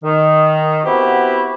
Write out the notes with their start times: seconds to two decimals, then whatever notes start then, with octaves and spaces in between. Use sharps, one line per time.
0.03 D#3
0.85 B3 C4 E4 F#4 G4